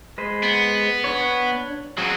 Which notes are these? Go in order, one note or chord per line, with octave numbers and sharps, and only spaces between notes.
G#3 B4 C5
B3
D4 B4 C#5
F#3 C4 G#4 F#5